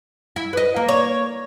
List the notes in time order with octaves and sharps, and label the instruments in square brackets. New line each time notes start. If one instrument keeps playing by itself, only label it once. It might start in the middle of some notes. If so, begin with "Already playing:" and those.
[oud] E4
B4 D#5
A#3
[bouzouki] C#5